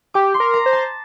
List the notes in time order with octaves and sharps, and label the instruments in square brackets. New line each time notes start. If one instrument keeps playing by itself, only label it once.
[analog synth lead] G4 [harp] D6
[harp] C6
[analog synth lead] A#4
[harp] A#5
[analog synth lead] C5
[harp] A5